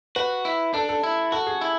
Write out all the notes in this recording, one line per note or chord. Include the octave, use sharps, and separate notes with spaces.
F#4 B4
E4
D4 A4
A4
E4
F#4 A4
G#4
E4